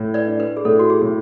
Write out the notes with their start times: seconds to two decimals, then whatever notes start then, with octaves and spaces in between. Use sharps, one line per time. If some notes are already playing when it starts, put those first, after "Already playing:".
Already playing: A2
0.14 B4 D5
0.27 D4
0.40 B4
0.57 G#4
0.65 A2 A4
0.79 F#4
0.90 G#4
1.02 A2